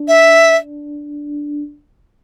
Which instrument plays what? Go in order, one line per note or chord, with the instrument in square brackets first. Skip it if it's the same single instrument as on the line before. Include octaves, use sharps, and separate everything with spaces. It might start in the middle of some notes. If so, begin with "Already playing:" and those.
Already playing: [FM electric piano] D4
[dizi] E5